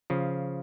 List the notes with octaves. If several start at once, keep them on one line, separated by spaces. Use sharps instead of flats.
C#3 F3